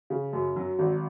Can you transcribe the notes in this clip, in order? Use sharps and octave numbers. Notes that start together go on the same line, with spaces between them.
C#3
F#2
F#3
G#1